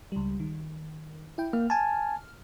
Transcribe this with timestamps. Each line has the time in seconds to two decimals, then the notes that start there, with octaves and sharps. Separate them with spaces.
0.12 C#2 G3
0.40 D#3
1.38 E4 G5
1.53 A#3 F6
1.70 G#5 A5